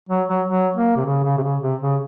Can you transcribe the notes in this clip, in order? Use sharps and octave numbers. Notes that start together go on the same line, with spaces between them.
F#3
F#3
F#3
A#3
C3
C#3
C#3
C3
C#3
C3
C#3